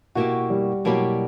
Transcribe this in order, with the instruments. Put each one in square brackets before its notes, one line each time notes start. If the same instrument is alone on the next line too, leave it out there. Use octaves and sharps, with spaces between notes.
[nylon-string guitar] B2 A#3 E4 G4 [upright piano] F#4
[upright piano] G3
[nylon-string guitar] B2 A#3 E4 G4 [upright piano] F#3